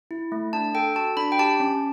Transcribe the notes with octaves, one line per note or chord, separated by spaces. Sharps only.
E4
A3
D4 A5
A4 G5
F#4 A5
D4 B5
G5
G4 A5
C#4